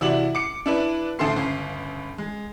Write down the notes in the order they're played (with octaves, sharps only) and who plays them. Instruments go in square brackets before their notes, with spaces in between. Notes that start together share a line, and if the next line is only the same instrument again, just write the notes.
[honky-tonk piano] C3 E3 E4 F#4 D5 F#7
D6 C#7
D4 E4 B4
D2 A2 E4 A4 C6 C7
G1 C#2 C7
G#3